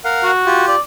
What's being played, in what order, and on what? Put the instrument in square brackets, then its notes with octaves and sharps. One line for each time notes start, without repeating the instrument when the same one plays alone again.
[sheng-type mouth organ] A#4 F5 F#5
[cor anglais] F#4
[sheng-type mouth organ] F4 G4
[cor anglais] D5